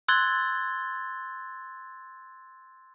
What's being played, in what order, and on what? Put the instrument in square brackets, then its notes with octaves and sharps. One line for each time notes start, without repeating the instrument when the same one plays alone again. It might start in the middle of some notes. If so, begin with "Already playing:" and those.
[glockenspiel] C6 E6 F#6 G#6 A6 G7